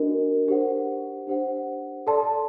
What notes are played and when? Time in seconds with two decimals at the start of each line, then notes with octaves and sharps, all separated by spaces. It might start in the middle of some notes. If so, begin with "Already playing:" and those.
Already playing: D4 F#4 A#4 D#5
0.47 D4 G4 C5 F#5
1.27 D4 G4 C5 F#5
2.07 A4 D5 A5 C6